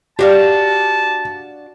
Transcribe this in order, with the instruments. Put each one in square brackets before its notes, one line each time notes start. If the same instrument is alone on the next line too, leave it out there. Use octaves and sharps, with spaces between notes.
[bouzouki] D4 F#4 F5 [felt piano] G4 [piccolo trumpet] A5